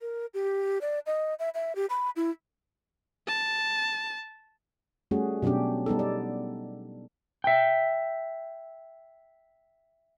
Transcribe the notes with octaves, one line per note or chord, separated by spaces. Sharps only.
A#4
G4
D5
D#5
E5
E5
G4
B5
E4
A5
G3 A3 C#4 F#4 G#4
B2 F#3 C#4 D4 G4
G3 B3 D#4 A4
D5
E5 G5